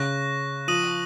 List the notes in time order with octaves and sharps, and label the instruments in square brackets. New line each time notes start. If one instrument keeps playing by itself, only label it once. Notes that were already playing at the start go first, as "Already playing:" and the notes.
Already playing: [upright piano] C#3 [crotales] C#6 F#6 A#6
[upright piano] F3 [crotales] D#6 A#6 D#7 F#7